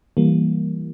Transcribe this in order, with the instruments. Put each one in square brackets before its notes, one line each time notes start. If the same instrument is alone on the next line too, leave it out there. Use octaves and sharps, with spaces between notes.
[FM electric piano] E3 G3 A#3